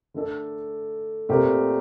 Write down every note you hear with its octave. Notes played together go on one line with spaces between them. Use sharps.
D3 A3 D4 A4
A#2 A3 C4 G4 A#4